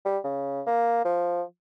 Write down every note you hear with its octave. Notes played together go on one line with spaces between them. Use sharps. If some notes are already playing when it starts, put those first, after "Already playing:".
G3
C#3
A#3
F3